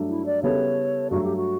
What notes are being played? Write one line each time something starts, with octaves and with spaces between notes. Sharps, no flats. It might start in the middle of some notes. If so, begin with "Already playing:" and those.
Already playing: G2 F#3 A3 D4
E4
D5
C#3 G3 B3 E4 A4 C#5
G2 F#3 A3 F#4
G4
F#4